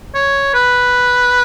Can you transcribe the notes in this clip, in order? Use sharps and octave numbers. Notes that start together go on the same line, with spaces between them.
C#5
B4